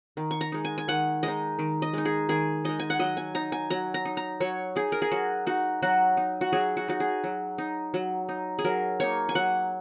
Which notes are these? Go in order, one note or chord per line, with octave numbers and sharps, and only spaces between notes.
D#3
C#6
A#5
G#3 D#4
G#5
G#5
D#3 F#5
G#3 D#4 D#5
D#3
D#5
G#3 D#4
G#4
D#3 G#4
G#3 D#4 D#5
G#5
F#5
F#3 D#5
G#5
D#4 A#5
G#5
F#3 A#5
A#5
D#4
A#5
F#3 C#5
D#4 G#4
A#4
G#4
F#3 F#4
D#4 F#4
F#3 F#4
D#4
F#4
F#3 G#4
F#4
D#4 F#4
G#4
F#3
D#4
F#3
D#4
G#4
F#3 A#4
A#3 D#4 C#5
G#5
F#3 F#5